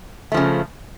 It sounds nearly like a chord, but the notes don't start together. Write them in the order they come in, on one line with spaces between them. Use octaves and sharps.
A3 F3 C#3